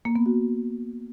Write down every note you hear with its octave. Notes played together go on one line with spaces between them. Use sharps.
A#3
B3
F#4